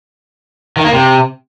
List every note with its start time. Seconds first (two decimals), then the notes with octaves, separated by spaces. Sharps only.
0.77 D#3
0.85 A#3
0.93 C3